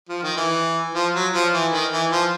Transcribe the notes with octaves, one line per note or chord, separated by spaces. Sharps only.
F3
D#3
E3
F3
F#3
F3
E3
D#3
E3
F3